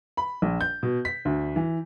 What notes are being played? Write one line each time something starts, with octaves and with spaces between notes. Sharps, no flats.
B5
A#1
G6
B2
B6
D2
E3